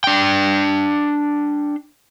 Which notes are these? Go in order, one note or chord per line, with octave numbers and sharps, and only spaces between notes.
D4 G5